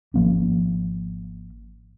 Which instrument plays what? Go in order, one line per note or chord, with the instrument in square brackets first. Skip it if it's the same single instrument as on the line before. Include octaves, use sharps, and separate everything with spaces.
[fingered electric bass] G#1 F3 A#3 C#4